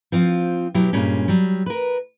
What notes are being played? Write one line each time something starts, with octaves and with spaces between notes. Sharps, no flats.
F3 C4 F4
B2 F#3 E4 G4
G2 A#2 G3 G#3 C#4
F#3 G3
A#4 B4